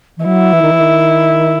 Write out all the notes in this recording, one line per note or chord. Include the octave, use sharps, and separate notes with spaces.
E3
F#3 E4
E3
D#3
E3
D#3